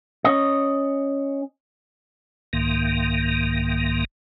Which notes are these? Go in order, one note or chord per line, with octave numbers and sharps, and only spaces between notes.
C#4 D#5
C2 G#2 D#3 A#3